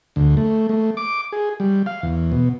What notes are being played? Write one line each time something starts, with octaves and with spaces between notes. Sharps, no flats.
D2
A3
A3
D6
G#4
G3
F5
E2
B2